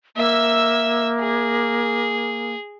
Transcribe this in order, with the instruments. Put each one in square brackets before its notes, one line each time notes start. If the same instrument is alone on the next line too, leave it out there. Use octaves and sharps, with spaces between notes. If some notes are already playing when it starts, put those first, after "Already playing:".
[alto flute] A#3 [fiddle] E5 E6
[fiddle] G#4